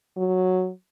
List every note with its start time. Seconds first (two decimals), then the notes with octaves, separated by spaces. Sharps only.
0.17 F#3